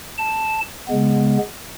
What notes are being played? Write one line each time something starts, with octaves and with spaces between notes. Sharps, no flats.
A5
C#3 G#3 B3